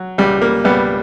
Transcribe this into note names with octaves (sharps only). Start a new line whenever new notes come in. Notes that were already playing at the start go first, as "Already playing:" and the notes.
Already playing: F#3
C#2 G3
A#3
C#2 G3 B3